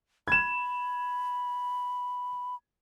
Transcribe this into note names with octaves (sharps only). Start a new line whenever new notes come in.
B5 G#6 E7